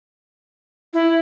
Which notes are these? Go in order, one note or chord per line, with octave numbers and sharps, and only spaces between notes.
E4